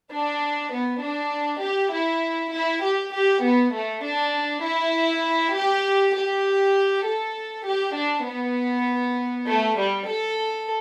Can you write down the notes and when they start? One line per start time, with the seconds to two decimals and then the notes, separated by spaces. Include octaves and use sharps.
0.12 D4
0.73 B3
1.03 D4
1.63 G4
1.93 E4
2.54 E4
2.84 G4
3.14 G4
3.44 B3
3.74 A3
4.05 D4
4.64 E4
5.55 G4
6.15 G4
7.06 A4
7.66 G4
7.96 D4
8.27 B3
9.47 A3
9.77 G3
10.08 A4